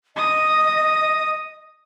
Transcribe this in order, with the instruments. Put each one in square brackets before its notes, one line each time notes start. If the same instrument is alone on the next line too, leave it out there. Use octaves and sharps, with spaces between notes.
[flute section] D#5 [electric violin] D#6